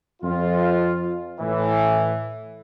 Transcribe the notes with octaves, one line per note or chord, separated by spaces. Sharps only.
F2 F4
A2 E3